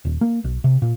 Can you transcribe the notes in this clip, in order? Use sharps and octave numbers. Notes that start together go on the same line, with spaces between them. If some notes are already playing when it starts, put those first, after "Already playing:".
D#1
A#3
B1
C3
A#2